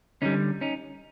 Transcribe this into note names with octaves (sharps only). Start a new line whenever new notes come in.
D3 G3 C#4 D#4
C#4 D#4